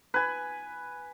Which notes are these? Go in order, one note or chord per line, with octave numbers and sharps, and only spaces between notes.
B4 G#5